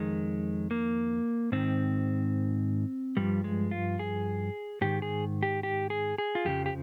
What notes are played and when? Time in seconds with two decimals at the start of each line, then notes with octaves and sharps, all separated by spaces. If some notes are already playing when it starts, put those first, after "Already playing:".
Already playing: F2 D#3 G#3
0.71 A#3
1.52 G#2 D#3 C4
3.17 G2 F3 G3
3.44 G#3
3.71 F4
3.99 G#4
4.81 G#2 D#3 G4
5.02 G#4
5.43 G4
5.63 G4
5.90 G#4
6.18 G#4
6.35 F4
6.45 F2 C#3 F3 G4
6.66 G4